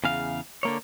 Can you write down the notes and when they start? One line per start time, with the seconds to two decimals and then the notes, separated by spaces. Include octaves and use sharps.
0.04 E2 C#3 F5
0.63 D3 A#3 C#5